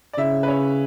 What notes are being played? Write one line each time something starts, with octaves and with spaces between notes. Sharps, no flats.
D5
C#3 E4 E5
B4
C#4 C#5